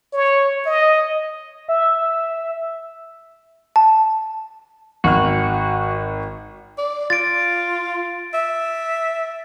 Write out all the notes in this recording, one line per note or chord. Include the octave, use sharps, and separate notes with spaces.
C#5
D#5
E5
A5
G#1 F#4 F6
D5
F4 A6 D7
E5